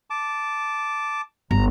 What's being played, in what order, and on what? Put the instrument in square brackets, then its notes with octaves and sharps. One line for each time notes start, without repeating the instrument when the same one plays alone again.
[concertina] A5 D6
[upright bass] G1 [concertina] A#5